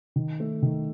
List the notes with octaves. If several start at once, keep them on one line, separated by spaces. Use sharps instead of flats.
D#3
A3
D#3